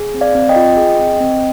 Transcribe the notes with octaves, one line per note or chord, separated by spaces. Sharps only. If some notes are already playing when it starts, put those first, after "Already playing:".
Already playing: G#4
C4
D5 F5
C4
D#5 G5
F4
G#4
C4
C4